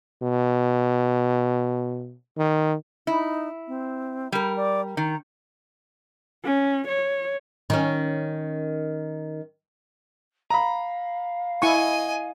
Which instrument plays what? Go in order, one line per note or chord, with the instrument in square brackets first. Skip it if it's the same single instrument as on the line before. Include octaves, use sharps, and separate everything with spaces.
[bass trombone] B2
D#3
[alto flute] D#4 [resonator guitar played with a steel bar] E4
[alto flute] C4
[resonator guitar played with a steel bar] G3 A#4 [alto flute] B5
[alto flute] D5
[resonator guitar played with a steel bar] D#3 [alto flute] A#5
[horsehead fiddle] C#4
C#5
[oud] D#3 C#4
[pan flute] F5 [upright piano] A#5 B5
[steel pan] E4 C#6 [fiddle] D#5 G#5